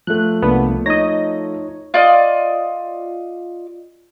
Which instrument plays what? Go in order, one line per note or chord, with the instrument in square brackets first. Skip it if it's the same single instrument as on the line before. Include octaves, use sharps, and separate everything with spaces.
[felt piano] F3 A3 [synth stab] F#6
[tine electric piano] C2 A#3 D4 [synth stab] B3
[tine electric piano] D#4 C#5 [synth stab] D#5 A#6
[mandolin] F4 D5 D#5